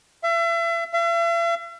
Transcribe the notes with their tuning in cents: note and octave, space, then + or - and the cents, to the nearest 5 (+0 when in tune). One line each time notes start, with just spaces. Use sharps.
E5 +35
E5 +45